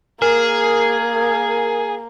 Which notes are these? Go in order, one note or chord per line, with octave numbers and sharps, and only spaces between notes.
A#3 G#4 A#4